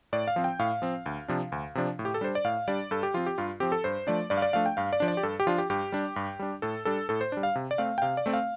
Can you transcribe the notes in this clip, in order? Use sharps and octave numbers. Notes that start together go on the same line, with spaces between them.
A2 D5
F5
F3 C4
G5
A2 F5
F3 C4
D2
C3 F3 D4
D2
C3 F3 D4
A2
G4
A4
G3 D4 C5
D5
A2 F5
G3 D4 D5
G2 A4
G4
F3 C4 F4
G4
G2 F4
F3 C4 G4
A4
G2 C5
F3 A3 D4 D5
G2 D5
F5
D5
F3 A3 D4 F5
G5
G2 F5
D5
F3 D4
D5
G4
G2 A4
G4
F3 D4 F4
G4
G2 G4
G3 D4
G2
G3 D4
A2 A4
G3 D4 A4
A2 A4
C5
G3 D4
F5
C3
D5
A3 C4 F5
G5
C3 F5
D5
A3 C4
F5